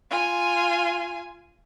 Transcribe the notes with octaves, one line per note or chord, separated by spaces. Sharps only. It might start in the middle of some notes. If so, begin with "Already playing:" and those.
F4 G#5